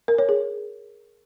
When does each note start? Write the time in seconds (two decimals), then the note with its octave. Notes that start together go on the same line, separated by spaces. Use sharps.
0.08 A#4
0.18 C#5
0.29 G#4